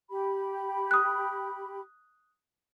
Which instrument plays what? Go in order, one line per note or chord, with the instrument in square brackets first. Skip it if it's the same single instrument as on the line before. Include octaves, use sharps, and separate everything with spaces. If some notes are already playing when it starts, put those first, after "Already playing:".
[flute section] G4 B5
[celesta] D#6 F#6